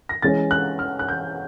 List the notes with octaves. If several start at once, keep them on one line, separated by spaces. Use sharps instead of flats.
A#6
E3 G#3 C#4 A6
F#6
F6
F#6
G6